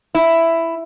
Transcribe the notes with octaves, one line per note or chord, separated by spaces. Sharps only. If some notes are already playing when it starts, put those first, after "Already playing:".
E4